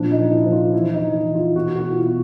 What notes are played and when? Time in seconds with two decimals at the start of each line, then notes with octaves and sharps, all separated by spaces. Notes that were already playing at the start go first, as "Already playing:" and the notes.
Already playing: A#2 F3 D4
0.12 D#4
0.19 F3
0.32 E4
0.46 F3
0.52 F4
0.73 E3 E4
0.94 D#4
1.00 E3
1.14 E4
1.28 E3
1.35 F4
1.55 B2 F#4
1.76 F#4
1.83 B2
1.90 F4
1.96 E4